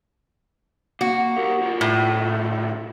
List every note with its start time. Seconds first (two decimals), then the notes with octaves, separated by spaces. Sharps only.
1.01 A#3 F#4
1.36 G4 A#4
1.61 D2 F4
1.81 A2